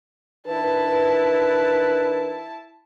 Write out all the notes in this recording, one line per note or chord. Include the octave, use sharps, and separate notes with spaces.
D#3 D4 E4 B4 A5